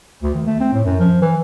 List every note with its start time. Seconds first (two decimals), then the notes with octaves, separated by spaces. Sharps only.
0.23 D2
0.35 D#3
0.47 A3
0.60 C4
0.73 A2
0.85 F#2
0.99 F3
1.22 E3